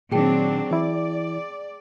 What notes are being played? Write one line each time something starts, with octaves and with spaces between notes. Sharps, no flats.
A#2 D#3 F#3 C4 D4 G#4 G5 A5
E3 E4 D5